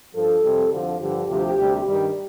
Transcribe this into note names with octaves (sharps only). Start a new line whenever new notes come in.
G2 F3 A4
F2 C3 G3
F2 D3 F3
G2 D3 F3 G4
D2 C3 F3 G4
D2 C3 G3
G2 D#3 G3